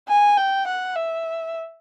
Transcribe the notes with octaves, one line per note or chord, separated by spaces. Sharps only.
G#5
G5
F#5
E5